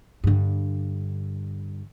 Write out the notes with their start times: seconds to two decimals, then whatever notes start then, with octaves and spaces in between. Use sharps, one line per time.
0.24 G2 D3